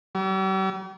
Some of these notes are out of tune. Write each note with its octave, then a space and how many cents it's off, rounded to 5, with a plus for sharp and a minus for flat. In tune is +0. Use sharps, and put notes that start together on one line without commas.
G3 -45